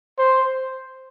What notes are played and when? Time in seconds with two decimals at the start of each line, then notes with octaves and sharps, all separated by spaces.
0.18 C5